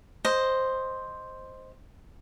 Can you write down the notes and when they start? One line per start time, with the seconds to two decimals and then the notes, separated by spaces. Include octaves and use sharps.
0.25 C5 D#5